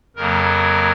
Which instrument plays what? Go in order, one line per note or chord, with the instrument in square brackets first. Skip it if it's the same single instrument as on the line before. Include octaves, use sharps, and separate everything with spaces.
[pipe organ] F2 C#3 F#3 A#3 A#4